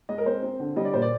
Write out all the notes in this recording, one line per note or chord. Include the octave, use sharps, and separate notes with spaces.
G#3 D#5
A#4
C4 C5
C4
D3
G3 D#5
D5
A#2 C5
D5